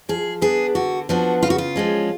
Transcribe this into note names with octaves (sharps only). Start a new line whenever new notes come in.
F3 G#4
B3 D4 G#4
D3 F#4
F3 B3 D4 F#4
C#3 F4
F#4
F4
F3 G#3 C#4